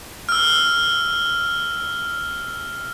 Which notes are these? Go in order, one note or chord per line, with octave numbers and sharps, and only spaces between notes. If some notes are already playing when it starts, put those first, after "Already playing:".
E6 F6